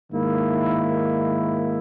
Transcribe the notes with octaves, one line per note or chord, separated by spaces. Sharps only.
G#2 D#3 A#3 E4